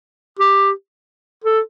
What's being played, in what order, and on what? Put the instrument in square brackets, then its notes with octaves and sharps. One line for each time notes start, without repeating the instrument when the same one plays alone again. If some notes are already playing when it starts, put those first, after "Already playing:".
[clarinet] G4
A4